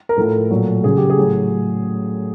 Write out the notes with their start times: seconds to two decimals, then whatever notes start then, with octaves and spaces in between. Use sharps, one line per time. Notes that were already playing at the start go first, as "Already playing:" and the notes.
0.09 A#4
0.17 A2 F3 A4
0.50 A#2 F#3
0.84 C#3 F#3 G#4
0.97 G4
1.10 G#4
1.18 A2 F#3